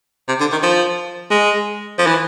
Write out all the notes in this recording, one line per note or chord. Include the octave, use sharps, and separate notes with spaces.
C3
D3
D#3
F3
G#3
F3
E3